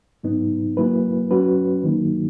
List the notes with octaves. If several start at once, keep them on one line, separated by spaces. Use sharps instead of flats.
G#2 F#3 B3 D#4
F#3 A#3 E4 B4
F#3 C#4 F#4 B4
D#3 F#3 A#3 D#4